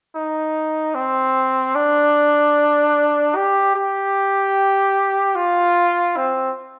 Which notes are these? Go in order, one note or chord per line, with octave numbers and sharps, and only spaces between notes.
D#4
C4
D4
G4
G4
F4
C4